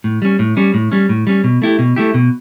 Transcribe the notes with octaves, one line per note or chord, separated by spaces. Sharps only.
A2
G3 C#4
A2
G3 C#4
A2
G3 C#4
A2
G3 C#4
B2
A3 E4 G4
B2
A3 E4 G4
B2